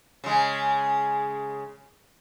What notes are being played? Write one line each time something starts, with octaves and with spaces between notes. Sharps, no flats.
C#3 G#3